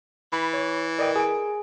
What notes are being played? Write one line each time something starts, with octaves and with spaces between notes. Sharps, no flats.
E3 B5
C#5
A#4 D5 D#5 G5
G#4 G#5 D7